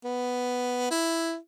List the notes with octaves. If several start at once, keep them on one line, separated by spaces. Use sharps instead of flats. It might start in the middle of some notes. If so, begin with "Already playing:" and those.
B3
E4